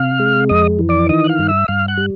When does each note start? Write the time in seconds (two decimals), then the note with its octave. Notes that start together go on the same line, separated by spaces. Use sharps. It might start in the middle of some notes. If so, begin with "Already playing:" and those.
Already playing: C3 F5 F6
0.20 G#3
0.49 F2 D#5 D#6
0.79 E3
0.89 D5 D6
1.09 D#3 D#5 D#6
1.24 F#6
1.29 F5 F6
1.39 G2
1.48 E5 E6
1.68 G2 F5 F6
1.88 F#5 F#6
1.97 G3